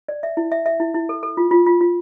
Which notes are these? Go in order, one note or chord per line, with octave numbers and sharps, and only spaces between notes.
D5
E5
E4
E5
E5
E4
E4
A4
A4
F4
F4
F4
F4